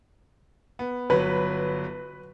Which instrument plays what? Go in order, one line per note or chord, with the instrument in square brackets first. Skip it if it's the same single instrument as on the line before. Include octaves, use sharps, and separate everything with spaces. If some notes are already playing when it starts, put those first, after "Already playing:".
[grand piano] B3
[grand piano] G1 F#3 [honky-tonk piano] B4